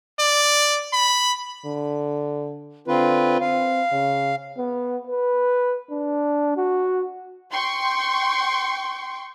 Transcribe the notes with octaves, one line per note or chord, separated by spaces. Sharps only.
D5
B5
D3
D3 C4 F4 B4
C4 F5
C#3
B3
B4
D4
F#4
G5 C6 C#6